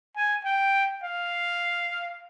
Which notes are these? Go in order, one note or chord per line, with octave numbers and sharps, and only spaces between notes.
G#5
G5
F5